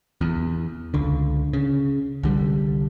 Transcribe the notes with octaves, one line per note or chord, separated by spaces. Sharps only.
E2
C#2 D3
C#3
C2 D3 G3